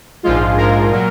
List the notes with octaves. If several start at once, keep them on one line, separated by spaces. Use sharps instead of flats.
A#1 G#2 F3 G#3 F4
A#1 G#2 F3 G#3 A#4
A#2 F#3